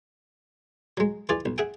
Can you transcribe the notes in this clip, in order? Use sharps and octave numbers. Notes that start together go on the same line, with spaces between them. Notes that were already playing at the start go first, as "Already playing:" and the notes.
F#3 G#3
E3 F4 G#4 D5
B1
G#4 E5 F#5 G5